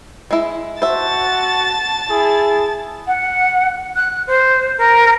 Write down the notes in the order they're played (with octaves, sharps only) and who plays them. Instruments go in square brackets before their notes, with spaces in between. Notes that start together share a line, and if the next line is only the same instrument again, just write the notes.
[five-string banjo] G#3 E4
[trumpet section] F#4 F#5 [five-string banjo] C5 E5 [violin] A5 A6
[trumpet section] E4 G#4
[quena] F#5
F#6
C5
A#4